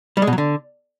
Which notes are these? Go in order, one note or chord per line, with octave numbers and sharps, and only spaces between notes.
G3
G#3
B2
F#3
D3